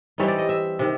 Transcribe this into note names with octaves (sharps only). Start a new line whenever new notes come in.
E3 G3 C4 D#4 C#5
D5
D#5
E5
C3 D#3